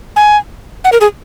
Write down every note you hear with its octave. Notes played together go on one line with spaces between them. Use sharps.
G#5
F#5
A#4
G#4